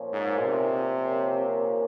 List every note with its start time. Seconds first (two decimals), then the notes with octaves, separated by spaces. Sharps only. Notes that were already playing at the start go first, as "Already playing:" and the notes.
Already playing: A#2 F3 A#3 C#4
0.13 G#2
0.43 C3
1.02 A#2 F3 A#3 C#4